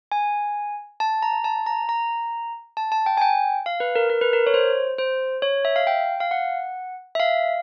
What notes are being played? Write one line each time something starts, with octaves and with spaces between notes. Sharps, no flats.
G#5
A5
A#5
A5
A#5
A#5
A5
A5
G5
G#5
G5
F5
B4
A#4
A#4
B4
A#4
C#5
C5
C5
C#5
E5
F5
G5
F5
F#5
E5
F5